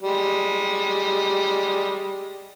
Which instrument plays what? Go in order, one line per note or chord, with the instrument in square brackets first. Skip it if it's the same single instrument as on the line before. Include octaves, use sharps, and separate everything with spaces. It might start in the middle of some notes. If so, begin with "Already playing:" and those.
[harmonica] G3 G#3